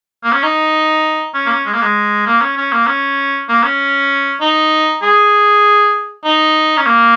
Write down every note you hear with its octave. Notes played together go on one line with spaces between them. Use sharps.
A#3
C#4
D#4
C#4
A#3
C#4
G#3
A#3
G#3
A#3
C#4
C#4
A#3
C#4
A#3
C#4
D#4
G#4
D#4
C#4
A#3